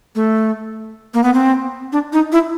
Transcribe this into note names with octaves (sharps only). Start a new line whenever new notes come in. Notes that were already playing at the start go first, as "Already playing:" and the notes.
A3
A#3
B3
C4
D4
D#4
E4